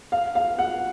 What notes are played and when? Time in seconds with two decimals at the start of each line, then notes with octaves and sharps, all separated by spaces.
0.12 F5
0.35 F5
0.59 F#5